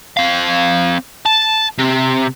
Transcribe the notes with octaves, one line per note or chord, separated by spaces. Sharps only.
C4 F5
A5
C3